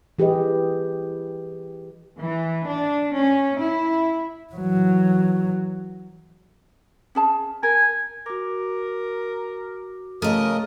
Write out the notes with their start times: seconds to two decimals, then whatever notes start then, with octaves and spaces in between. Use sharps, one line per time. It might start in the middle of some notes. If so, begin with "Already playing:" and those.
0.19 E3 G4 G#4 B4 D#5
2.21 E3
2.68 D4
3.17 C#4
3.60 E4
4.53 E3 F#3
7.15 C#4 G#4 A5
7.63 A#4 G#5
8.26 F#4 A#4 D6
10.22 C#3 A3 A#4 D#5 D#6